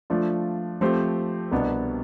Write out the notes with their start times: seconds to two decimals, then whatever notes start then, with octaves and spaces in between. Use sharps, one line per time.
0.10 F3 A3 D4 F4
0.81 F3 A3 C4 G4 C5
1.52 C2 B2 B3 D4